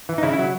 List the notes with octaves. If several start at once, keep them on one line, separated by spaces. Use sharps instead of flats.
E3
D#4
C#3 E4
E4
F#3